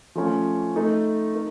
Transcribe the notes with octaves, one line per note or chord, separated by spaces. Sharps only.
F3 A3 C#4
A3 D#4 A4
D#4 A#4